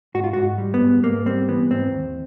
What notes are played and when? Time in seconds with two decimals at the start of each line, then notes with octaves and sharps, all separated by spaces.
0.14 G#2 F#4
0.24 F4
0.33 G#2 F#4
0.58 G3
0.74 B3
0.81 G#2
1.03 G#2 A#3
1.26 G3 C4
1.48 E3 B3
1.71 G#2 C4
1.92 D#2